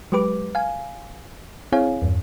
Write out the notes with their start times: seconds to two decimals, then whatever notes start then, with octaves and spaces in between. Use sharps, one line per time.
0.12 F#3 G#3 G4 B4 D6
0.55 F5 G#5
1.72 C4 E4 G#4 C#5 F5 G#5
2.02 E2 G2